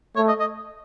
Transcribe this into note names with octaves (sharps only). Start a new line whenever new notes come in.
A3 C#5
D#5
D#5